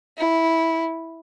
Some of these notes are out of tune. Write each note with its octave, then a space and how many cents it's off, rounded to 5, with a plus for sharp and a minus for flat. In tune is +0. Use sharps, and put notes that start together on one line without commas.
E4 -10